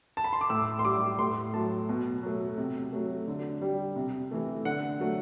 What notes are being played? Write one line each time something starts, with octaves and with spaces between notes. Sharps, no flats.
A5
B5
C6
D6
A2 E6
C6
G3 D6
A2 C6
F#3 A3 A5
B2
F#3 A3
C3
F#3 A3
D3
G3
C3
E3 A3
D3 F#5
F#3 A3